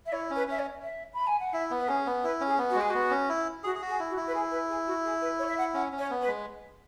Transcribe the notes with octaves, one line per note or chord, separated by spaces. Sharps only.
E5
E4 C#5
C#4
B4
C#4 E5
C#5
E5
B5
G#5
F#5
E4 E5
B3
B4
C#4 G#4
B3
E4 B4
C#4
G#4
B3
F#4
G#3
G#4
B3 F#4
C#4
E4
F#4 G#4
G#4
F#4
G#4
E4
F#4
E4
B4
G#4
B4
G#4
F#4
G#4
B4
C#5
E5
F#5
C#4 F#5
C#4
C#5
B3
B4
G#3